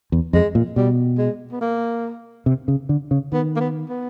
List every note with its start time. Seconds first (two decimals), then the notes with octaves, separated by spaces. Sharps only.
0.12 E2
0.33 F2 G#3
0.55 A#2
0.76 B2 G3
1.18 G#3
1.52 B3
1.61 A#3
2.46 C3
2.68 C#3
2.89 D3
3.11 C#3
3.32 D#3 B3
3.56 A#3
3.60 B3
3.89 B3